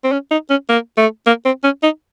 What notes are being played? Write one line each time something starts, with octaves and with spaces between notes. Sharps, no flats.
C4
C#4
D#4
C#4
A#3
A3
A#3
C4
C#4
D#4